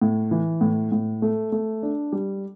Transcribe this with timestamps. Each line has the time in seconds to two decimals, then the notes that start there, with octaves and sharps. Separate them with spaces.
0.02 A2
0.31 E3
0.61 A2
0.92 A2
1.22 A3
1.52 A3
1.83 D4
2.12 G3